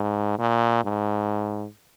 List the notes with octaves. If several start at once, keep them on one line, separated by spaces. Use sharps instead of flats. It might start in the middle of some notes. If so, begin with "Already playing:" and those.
Already playing: G#2
A#2
G#2